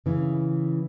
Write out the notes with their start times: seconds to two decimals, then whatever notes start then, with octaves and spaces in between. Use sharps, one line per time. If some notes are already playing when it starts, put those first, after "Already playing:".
0.06 C#3 E3